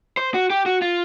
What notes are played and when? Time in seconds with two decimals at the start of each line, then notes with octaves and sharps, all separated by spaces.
0.17 C5
0.34 F#4
0.50 G4
0.66 F#4
0.82 F4